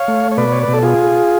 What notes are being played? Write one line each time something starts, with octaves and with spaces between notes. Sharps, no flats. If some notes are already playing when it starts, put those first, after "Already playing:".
Already playing: C#5 F5
A3
C#5
B2 B4 D5
C#5
B4
B2
A4
F4 G#4